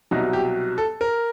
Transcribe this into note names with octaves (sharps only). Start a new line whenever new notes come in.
C2 B2 F#3 D#4
G4
A4
A#4